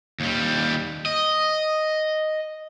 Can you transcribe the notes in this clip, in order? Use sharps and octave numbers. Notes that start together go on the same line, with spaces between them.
D#2 G3
D#5